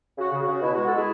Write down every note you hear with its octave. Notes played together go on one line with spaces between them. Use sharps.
C#3 F#4
C#3
F#4
C#3
B2 E4
F#4
G#3
F#4 A4
B2 E4 G#4